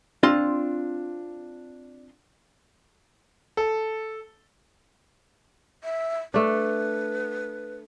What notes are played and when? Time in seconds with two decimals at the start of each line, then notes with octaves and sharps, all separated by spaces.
0.23 C4 D4 F4 C6
3.57 A4
5.84 E5
6.34 A3 D4 B4